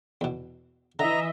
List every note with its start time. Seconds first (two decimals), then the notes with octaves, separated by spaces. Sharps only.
0.21 E2 B2
0.99 D3 E3 D#5 E5 A#5